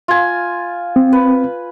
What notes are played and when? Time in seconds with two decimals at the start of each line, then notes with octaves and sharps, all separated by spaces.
0.08 F4 G#5
0.96 C4
1.13 B4